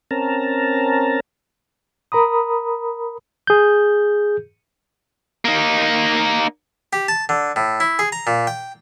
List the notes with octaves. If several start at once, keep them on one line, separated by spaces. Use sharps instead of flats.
C4 C#4 A#4 A5 A#5
A#4 A#5 B5 D#6
G#4 G6
A#3 D#4
G4
A5
D3
A2
E4
G#4
A#5
A#2
G5